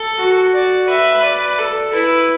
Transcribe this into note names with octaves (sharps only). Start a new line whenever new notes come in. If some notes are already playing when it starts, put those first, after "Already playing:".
Already playing: A4
F#4
D5
B4 E5
D5
A4
E4 B4